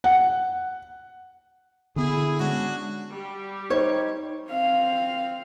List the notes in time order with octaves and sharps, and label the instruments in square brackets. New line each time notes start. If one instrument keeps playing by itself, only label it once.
[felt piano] F#5
[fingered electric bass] D3 B3 [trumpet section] E4 G#4
[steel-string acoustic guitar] G#3 C#4 [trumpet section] D4 F#4
[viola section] G3 G4
[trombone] D#4 [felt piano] C5 [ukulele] C#5
[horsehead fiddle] C4 F5